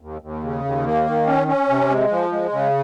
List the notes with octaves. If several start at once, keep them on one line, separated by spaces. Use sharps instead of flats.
D#2
D#2
C#3
D#2
A#3
D#3
C#4
C#4
C3
G#3
F3
G#3
C#3